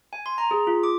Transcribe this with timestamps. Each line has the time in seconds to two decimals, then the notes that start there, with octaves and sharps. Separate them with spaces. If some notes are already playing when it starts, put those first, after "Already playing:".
0.13 G#5
0.26 C6
0.38 A#5
0.51 G#4
0.67 F4
0.83 D6